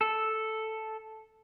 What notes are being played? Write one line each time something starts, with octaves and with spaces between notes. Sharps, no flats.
A4